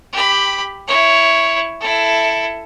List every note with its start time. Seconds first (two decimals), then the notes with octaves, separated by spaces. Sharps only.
0.13 G4 B5
0.87 E4 C#5
1.81 E4 A4